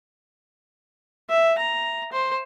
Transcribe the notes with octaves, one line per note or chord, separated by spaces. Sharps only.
E5
A#5
C5